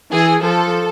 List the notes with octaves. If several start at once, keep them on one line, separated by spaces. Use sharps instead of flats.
E3 G#4
F3 A4